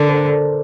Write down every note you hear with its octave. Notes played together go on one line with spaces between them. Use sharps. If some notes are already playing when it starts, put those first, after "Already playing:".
Already playing: D3 A#4 D5
A4 C5